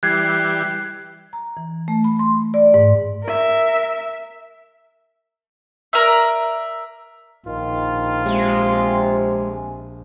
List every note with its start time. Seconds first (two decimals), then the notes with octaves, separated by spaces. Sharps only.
0.03 E3 G3 F#6 G#6 C7
1.33 A#5
1.57 E3
1.88 A3
2.04 B5
2.19 C6
2.54 D5
2.74 G#2
3.23 A#4 E5
5.93 A#4 D5 E5
7.47 A#1 D#3 F4
8.26 C3 G#3